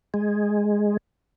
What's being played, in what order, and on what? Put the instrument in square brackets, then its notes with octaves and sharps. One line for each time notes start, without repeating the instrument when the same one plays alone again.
[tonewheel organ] G#3